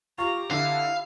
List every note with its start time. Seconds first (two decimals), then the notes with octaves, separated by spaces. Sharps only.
0.18 F4 G4 A#5 C#6
0.51 D3 E4 F5